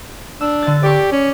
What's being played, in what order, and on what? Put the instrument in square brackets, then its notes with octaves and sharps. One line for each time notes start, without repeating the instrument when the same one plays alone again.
[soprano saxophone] D4 [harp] E6
[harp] D3 A6
[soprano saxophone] G4 [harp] D5 C#6
[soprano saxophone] C#4